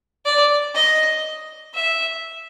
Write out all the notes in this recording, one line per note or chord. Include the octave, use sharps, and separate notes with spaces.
D5
D#5
E5